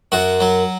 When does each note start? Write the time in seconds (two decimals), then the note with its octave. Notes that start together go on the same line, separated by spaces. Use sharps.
0.12 F#2 F#4
0.40 F#3